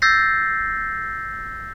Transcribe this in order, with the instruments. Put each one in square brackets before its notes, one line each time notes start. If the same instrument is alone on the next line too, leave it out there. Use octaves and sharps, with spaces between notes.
[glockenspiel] E6 G6 A6 A#6 C7